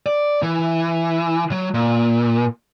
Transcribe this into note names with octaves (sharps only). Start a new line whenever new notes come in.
D5
E3
F#3
A#2